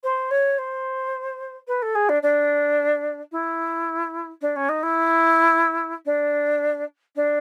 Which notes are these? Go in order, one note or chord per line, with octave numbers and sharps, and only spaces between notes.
C5
C#5
C5
B4
A4
G#4
D4
D4
E4
D4
C#4
D#4
E4
D4
D4